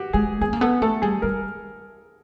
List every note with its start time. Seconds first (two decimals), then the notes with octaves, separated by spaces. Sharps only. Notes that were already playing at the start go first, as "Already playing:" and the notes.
Already playing: F#4 G4
0.13 G#3 G#4
0.41 B3 G#4
0.53 A#3
0.61 B3 A4
0.82 A3 A4
1.02 G3 G#4
1.22 G3 A#4